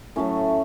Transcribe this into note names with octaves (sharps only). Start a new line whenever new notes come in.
A2 F#3 A3 C#4